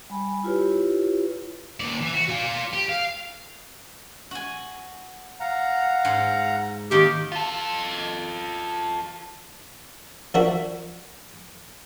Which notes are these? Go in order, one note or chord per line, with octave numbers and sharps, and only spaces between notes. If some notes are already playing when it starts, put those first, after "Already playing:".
G3 G#5 B5
E4 F4 G4 B4 C#5
D#2 D5
E3
F#4
F4 D5
G4
F5
F#4 G#5
F5 F#5 A#5
G#2
D#3 A#3 G4
F4 A4
F3 D4 F#4 A#4 E5 B5